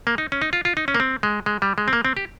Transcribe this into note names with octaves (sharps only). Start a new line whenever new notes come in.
A#3
D#4
C#4
D#4
F4
F4
D#4
C#4
A#3
C4
G#3
G#3
G3
G#3
C4
A#3
C4
G4